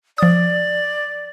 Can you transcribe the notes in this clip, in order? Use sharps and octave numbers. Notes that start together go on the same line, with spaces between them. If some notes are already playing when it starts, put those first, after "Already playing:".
F3 D5 D#6